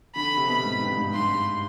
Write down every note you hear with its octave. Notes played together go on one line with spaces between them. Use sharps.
D3 B5
C3
B2 B5
G#2
G2
G#2
G2 C6